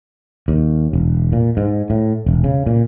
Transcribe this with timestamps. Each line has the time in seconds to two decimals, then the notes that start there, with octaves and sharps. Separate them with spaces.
0.48 D#2
0.93 E1
1.32 A#2
1.57 G#2
1.90 A2
2.26 E1
2.44 C#3
2.66 A#2